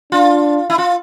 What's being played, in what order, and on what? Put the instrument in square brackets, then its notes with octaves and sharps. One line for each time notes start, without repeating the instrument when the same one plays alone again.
[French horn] D4 [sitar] F4
[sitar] E4
F4